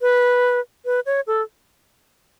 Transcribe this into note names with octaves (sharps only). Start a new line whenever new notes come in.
B4
B4
C#5
A4